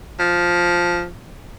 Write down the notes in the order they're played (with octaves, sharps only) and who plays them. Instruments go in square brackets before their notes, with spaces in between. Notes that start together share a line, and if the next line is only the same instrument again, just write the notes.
[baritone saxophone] F3